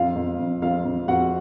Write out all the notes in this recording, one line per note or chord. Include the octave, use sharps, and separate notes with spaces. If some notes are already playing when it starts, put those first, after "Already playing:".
Already playing: F2 F4 F5
F2
F2
F2 F4 F5
F2
F2 F#4 F#5